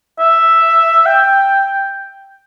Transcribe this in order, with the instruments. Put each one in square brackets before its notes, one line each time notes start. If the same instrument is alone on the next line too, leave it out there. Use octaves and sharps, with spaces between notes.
[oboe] E5
G5